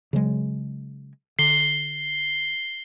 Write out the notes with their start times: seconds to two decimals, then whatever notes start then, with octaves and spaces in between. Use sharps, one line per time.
0.13 C#3 F#3 G#3
1.39 D3 C7 G7